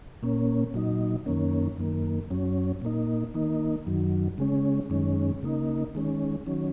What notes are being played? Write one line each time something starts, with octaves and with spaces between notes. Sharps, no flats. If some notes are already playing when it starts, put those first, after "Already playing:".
A#2 A#3 C#4
A#2 F#3 D#4
F#2 D#3 A#3 C#4
F#2 D#3 A#3
F#2 F#3 C#4
A#2 A#3 D#4
D#3 A#3 D#4
F#2 D#3 F#3
C#3 G#3 C#4
F#2 D#3 G#3 C#4
C#3 A#3 D#4
D#3 G#3 C#4
D#3 F#3 C#4